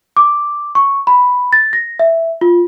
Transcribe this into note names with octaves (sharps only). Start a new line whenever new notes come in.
D6
C#6
B5
A6
A#6
E5
F4